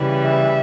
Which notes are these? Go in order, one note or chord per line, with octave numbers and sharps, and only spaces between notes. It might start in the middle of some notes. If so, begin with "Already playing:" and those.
Already playing: C#3 E3 G3
E5